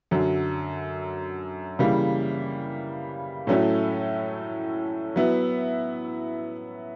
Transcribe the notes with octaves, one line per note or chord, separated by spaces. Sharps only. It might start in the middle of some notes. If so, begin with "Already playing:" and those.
F#2 D3 F#3
C#3 E3 G3 A#3
A2 F#3 A3 C#4 E4
F#3 B3 E4